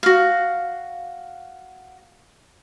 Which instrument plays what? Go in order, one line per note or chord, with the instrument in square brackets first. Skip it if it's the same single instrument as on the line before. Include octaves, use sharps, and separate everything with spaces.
[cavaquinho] F#4 F5